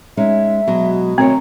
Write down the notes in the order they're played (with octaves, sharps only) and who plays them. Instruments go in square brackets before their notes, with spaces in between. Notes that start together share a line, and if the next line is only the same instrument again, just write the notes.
[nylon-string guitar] G#3 C#4 D#4 [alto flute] E5
[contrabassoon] B2 [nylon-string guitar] F#3 G#3
[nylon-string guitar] D2 A#4 C#5 [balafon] C4 [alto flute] A#5